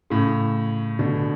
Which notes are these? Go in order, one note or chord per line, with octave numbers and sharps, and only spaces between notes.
A2 C#3
B2 D3